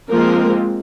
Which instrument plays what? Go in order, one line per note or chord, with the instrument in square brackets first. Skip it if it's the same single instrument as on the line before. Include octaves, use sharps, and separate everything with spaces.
[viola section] F3 G#3 A#3 C4 A#4